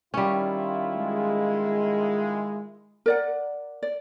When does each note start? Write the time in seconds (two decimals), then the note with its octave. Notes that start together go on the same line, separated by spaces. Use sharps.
0.14 D#3 G3 C#4 E4 F4
0.96 G#3
3.06 A#4 D5 F#5
3.83 D5